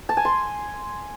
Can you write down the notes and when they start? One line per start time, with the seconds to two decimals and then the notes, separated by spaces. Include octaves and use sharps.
0.09 A5
0.17 G#5
0.25 C6